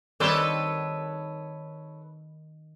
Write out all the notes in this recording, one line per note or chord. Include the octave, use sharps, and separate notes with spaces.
D#3 G3 C4 D4 A4 B4 C#5 D#5